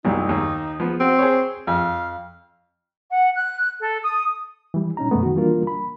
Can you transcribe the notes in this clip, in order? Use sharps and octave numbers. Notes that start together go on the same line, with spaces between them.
C2 F#2 A#2 D#4
D#2
F3 B3
C4 F#4
G#4 C5 C#5
F2 F5
F#5
F#6
A4
D#6
E3 G3
A#2 C#4 D#4 A#5
F#2 B2 F3 G#3 A3 B3
D#3 F#4
E3 G3 A#3 D4 F4 A#4
B5